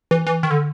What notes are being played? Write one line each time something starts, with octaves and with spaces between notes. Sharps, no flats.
E3
E3
D#3
D3